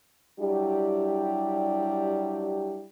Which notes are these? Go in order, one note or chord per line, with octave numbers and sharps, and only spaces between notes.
F#3 G3 D4 E4 G4